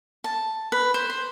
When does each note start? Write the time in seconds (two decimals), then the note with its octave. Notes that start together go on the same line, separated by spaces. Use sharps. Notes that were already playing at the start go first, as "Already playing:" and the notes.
0.24 A5
0.72 B4
0.94 C5
1.10 C5